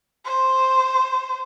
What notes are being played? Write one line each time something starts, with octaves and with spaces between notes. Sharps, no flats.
C5